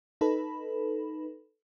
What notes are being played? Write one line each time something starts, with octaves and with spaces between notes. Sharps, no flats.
D#4 A4 B4 B5